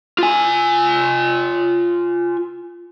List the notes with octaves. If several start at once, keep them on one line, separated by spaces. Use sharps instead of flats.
F4 G#5